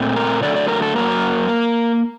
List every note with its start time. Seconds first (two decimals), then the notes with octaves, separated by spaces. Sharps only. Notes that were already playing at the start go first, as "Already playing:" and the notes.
Already playing: A#2 A3 C4
0.16 A#4
0.42 D3 F#3 A3 D5
0.56 D5
0.68 A#4
0.82 A4
0.95 F#2 F#3 A#3 A#4
1.48 A#3